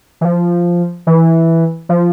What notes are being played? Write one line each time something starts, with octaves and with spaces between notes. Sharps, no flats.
E3
F3
E3
F3